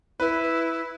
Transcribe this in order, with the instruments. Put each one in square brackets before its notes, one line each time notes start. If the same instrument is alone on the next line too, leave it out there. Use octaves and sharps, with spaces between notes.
[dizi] E4 [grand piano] B4